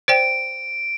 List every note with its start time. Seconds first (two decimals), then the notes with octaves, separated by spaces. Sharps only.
0.08 C5 D5 G5 D7